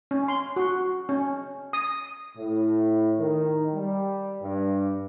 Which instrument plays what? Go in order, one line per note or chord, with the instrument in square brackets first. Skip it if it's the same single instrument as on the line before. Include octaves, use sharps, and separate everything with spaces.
[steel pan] C#4
C6
F#4
C#4
D#6
[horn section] A2
D#3
G3
G2